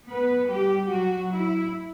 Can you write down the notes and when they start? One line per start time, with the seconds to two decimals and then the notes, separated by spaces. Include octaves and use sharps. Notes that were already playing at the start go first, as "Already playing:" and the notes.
0.08 B3 B4
0.49 G3 G4
0.90 F#3 F#4
1.32 E4